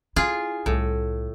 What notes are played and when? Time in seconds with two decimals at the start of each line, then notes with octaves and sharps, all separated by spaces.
0.16 E4 F4 G#4
0.66 C2 A2